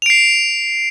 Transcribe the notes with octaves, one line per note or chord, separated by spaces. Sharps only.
C7 D7 F7